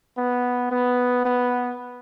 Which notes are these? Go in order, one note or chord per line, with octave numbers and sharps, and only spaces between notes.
B3
B3
B3